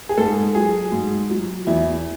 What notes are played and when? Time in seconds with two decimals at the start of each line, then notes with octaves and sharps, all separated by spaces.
0.09 G#4
0.18 G#2 A4
0.55 F#3 G#4
0.92 G#2
1.30 F#3
1.67 E2 E4